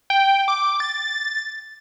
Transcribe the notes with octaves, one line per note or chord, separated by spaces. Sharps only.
G5
D6
A6